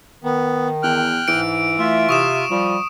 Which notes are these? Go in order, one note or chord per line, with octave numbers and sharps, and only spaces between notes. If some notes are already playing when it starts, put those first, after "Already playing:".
D#3 B3
E2 G5 F6 F#6
G#2 E3 D7
A3 F4 E5
C3 C#6 D#6 E7
F3 G3